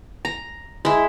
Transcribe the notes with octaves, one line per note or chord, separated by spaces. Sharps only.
A#5
G#3 E4